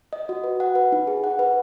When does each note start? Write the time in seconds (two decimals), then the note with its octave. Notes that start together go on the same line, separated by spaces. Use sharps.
0.13 D#5
0.29 F#4
0.44 B4
0.60 F#5
0.75 B4
0.92 D#4
1.07 G#4
1.24 F#5
1.39 B4